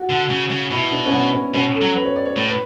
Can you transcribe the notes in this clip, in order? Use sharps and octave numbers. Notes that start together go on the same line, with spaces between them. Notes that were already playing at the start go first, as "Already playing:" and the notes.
Already playing: F#4
D3
C#3
C#3
B2 E4
D4
C#4
B3
C#4
B2 C#4
A4
F#3
B4
C#5
D5
C#5
A2
B4